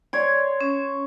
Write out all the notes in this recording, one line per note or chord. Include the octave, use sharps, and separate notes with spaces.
C#5 D5 C6
C#4